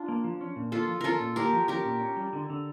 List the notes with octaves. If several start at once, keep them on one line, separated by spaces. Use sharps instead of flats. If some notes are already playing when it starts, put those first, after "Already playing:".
Already playing: D4 F4
A#3
F3
C#4
A#2
A#3 F4 A4
F3
C#4 F4 A4 A#4
A#2
A#3 G4 A#4
F3
C#4 G4 A#4
A#2
C#4
G3
D3
D3